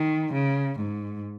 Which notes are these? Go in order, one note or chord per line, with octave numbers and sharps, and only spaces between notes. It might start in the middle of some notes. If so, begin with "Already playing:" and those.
Already playing: D#3
C#3
G#2